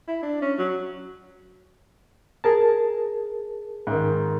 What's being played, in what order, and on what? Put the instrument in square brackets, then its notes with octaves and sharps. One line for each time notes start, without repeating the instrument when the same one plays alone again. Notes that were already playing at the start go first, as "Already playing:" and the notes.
[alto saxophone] E4
D4
C#4
F#3
[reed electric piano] G#4 A#4 A5
[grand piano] G#2 D#3